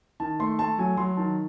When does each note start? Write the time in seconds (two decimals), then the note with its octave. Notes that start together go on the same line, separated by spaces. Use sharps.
0.20 D#3 A5
0.40 A3 C6
0.59 A3 A5
0.78 F#3 G#5
0.97 F#3 C6
1.17 D#3 A5